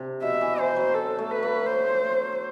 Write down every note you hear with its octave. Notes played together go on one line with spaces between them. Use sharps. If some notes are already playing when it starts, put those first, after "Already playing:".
Already playing: C3 D4
B2 E5
E3
E3 C5
F#3
A4
A3
B4
A3
C5